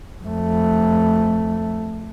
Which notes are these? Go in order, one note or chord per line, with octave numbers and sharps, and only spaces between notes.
F2 A3